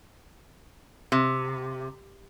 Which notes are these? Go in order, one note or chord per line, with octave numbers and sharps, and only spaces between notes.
C3